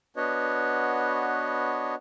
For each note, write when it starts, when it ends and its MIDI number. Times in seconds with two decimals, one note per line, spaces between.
0.16 1.95 59
0.16 1.95 62
0.16 1.95 66
0.16 1.95 71
0.16 1.95 73
0.16 1.95 75